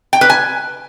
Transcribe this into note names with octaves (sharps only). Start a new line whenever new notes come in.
G5
B4
G#5